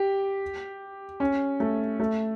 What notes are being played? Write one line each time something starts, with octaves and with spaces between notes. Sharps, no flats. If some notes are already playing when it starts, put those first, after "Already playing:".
Already playing: G4
C#4
A3
A3